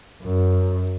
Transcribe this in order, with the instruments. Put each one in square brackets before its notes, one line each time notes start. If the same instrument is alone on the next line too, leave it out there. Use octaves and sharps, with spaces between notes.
[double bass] F#2